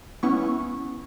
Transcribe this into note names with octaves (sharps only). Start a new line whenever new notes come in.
B3 C#4 E4 C#6